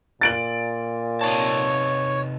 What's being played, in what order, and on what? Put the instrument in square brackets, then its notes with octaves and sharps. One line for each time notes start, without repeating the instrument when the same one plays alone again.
[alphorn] A#2 [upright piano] A6 D7 F#7
[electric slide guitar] C3 D#4 A5 [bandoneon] C#5